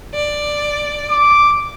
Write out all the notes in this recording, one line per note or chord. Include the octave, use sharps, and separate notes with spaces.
D5
D6